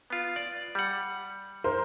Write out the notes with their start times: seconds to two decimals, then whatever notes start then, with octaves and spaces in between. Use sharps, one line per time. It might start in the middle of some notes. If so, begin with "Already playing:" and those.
0.10 B3 F4
0.36 D5
0.75 G3 F#5
1.64 A#4 C5